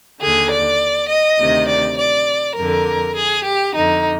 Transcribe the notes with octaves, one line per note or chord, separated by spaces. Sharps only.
D#2 D3 G#4
D5
D#5
D2 C3 D#3
D5
D5
F2 D3 A#4
G#4
G4
F2 D3 D#4